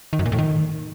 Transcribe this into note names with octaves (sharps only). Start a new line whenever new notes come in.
D#3
F#2
A#2
A2
D#3